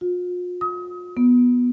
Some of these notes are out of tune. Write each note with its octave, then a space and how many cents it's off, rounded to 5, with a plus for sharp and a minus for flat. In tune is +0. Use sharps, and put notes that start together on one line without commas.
F4 +40
D#6 +35
B3 -10